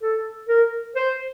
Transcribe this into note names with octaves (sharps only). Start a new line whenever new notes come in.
A4
A#4
C5